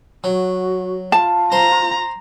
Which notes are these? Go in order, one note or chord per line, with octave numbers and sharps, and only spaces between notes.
F#3 F#4
F4 A5
C5 A#5